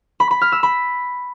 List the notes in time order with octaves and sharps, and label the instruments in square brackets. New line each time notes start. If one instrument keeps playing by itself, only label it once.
[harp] B5
B5
F6
E6
B5